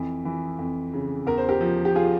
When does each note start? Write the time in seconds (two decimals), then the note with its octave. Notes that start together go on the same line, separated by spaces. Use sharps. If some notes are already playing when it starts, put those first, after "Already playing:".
Already playing: F2 E3
0.25 E3
0.59 F2
0.94 C#3
1.27 E2 A#4
1.38 C5
1.49 G4 A#4
1.61 F3
1.85 G4
1.96 F4 G#4